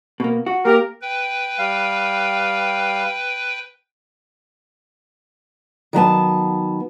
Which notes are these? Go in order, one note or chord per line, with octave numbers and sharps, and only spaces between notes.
B2 A#3
F#4
A#3 G4 A#4
B4 G5
G3 F5
D#3 F#3 B3 A5